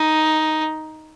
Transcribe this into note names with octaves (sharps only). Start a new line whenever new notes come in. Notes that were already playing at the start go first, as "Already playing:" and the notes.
Already playing: D#4